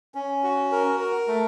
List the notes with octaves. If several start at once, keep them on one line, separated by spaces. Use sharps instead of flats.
C#4
F#4
A#4
A#4
A3